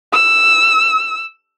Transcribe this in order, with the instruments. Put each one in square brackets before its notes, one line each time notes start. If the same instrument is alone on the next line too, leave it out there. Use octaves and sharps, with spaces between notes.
[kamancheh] E6